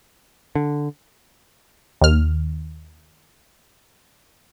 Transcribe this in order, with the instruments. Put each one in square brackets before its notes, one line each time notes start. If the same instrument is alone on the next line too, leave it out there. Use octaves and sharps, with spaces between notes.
[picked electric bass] D3
[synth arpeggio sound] D#2 F6